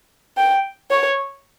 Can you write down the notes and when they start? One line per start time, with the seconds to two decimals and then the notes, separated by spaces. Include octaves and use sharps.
0.37 G5
0.90 C#5